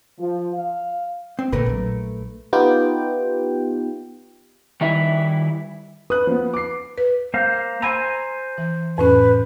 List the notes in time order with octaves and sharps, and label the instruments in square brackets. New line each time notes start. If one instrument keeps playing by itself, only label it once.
[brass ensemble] F3
F5
[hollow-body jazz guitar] C4
[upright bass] A#2 D3 [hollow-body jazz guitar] A3 A#4 B4
[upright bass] A#1 F#3
[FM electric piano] B3 D#4 F4 G4 G5
[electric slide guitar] D#3 G3 E4 E5
[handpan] B4 [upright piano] D#6 F#6
[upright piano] F3 B3
D6 C7
[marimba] B4
[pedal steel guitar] A#3 C5 F5
[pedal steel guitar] C5 G#5 A#5 [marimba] B5 E6
[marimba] E3
[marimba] F2 A2 C#4 [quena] B4